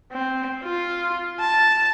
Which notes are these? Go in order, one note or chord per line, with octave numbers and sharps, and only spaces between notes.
C4
F4
A5